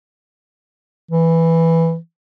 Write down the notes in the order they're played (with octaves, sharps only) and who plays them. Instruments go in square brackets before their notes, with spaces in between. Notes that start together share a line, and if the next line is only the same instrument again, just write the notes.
[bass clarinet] E3